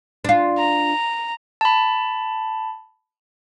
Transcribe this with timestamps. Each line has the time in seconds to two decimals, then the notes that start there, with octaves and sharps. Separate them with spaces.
0.25 D4 F4
0.58 A#5
1.61 A5 B5